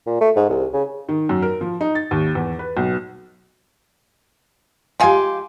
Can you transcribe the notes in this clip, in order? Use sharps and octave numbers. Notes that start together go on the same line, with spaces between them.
A#2
A3
G#2
C2
C#3
D#3
F#2
A#4
F3
D#4
A6
D#2
E2
B4
B1
G#3 F4 G4 F5 G#5